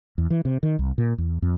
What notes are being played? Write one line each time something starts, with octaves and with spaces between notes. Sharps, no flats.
E2
E3
C3
D#3
C2
A#2
E2
F2